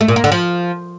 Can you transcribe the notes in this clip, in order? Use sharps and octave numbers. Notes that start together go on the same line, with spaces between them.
A3
A#2
A#3
D3
F3